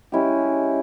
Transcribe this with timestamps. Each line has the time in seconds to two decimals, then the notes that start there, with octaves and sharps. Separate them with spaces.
0.12 G#3 C#4 E4 G4